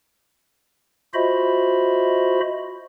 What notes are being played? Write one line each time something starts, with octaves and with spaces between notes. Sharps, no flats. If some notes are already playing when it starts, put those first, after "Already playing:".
F4 F#4 C5 D#5 E5 B5